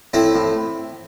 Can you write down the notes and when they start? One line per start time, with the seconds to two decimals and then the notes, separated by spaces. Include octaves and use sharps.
0.13 A2 C4 E4
0.35 A2